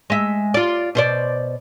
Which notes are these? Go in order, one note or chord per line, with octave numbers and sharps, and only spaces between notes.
G#3 E5
F4 D5
B2 C5 D5